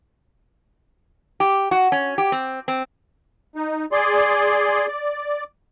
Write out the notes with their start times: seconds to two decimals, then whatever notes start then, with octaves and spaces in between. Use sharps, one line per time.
1.40 G4
1.71 F#4
1.92 C#4
2.18 G4
2.32 C4
2.68 C4
3.55 D#4
3.92 G#4 D5 C6
4.88 D5